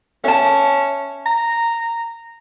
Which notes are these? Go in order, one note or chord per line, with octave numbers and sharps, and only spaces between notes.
C#4 E5 A5
A#5